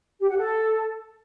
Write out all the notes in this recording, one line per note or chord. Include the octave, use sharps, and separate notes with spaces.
G4
F#5
A4